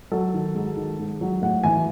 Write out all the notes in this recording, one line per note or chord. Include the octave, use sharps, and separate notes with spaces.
F#3 A4
D#3
G#2
D#3
G#2
F#3
A2 F#5
E3 G#5